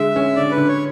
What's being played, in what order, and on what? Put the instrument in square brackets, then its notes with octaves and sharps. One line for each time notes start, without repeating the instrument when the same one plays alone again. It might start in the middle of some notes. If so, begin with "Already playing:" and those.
Already playing: [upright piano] D3 G#3 [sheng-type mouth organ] E5
[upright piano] C#4
[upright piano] D3 [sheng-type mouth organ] D5
[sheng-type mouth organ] B4
[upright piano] D3
[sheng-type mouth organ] C#5